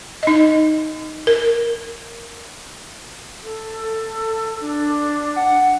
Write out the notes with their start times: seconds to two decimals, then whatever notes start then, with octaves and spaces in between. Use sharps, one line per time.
0.23 D#4 D#5
1.27 A#4
3.44 A4
4.61 D4
5.36 F#5